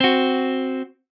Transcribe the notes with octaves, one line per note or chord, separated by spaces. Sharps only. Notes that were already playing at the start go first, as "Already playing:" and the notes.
C4 F#4